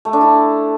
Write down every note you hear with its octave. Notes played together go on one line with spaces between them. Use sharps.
A3
D4
E4